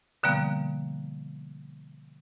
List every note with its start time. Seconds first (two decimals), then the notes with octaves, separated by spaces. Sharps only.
0.23 B2 D3 F3 G3 A#3 B3